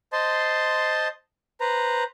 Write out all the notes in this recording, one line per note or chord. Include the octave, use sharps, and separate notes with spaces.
C5 D#5 A5 C6
B4 C5 A#5